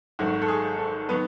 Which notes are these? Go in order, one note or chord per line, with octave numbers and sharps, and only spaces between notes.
G#1 G#2 F#3 A3 F#4
A4
G#4
A4
D#3 F#3 B3 B4